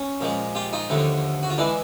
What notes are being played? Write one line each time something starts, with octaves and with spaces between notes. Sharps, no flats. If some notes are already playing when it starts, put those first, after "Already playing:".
Already playing: C#4
A#2 F3 G#3
F4 G4
D#4 F4
D#2 D3 F3 A3
F#4
F4
E3 G#3 D4 E4